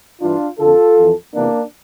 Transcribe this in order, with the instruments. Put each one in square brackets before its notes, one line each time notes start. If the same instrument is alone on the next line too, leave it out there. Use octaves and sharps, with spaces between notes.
[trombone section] G2 E3 D4 F4
F2 D3 F4 A4
F2 E3
E2 C3 E3 A#3 D4